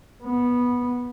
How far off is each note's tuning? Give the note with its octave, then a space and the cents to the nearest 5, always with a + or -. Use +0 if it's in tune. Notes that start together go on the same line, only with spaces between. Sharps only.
B3 -10